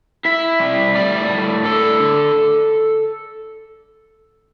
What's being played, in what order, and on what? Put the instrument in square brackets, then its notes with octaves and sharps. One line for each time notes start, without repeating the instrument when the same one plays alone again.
[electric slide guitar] E4 E5
G3
A2 D5
A2
D3 A4
D3